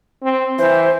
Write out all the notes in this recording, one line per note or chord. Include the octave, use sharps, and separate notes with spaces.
C4
E3 C5